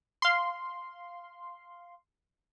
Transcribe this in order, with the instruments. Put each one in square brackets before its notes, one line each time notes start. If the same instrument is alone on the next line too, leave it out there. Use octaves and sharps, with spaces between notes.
[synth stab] F5 C6